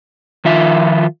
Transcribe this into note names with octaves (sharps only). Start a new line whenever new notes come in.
D#3 F3 F4 E5